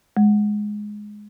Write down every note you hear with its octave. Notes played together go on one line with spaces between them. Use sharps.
G#3